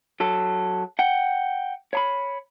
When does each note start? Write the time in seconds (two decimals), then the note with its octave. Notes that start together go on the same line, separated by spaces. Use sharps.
0.20 F#3 A4
0.99 F#5 G5
1.93 C#5 A#5 B5